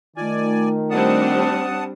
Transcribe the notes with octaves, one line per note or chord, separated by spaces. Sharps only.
D#3 A3 F4 D5 G#5
G3 C4 D4 F#5 A5 D#6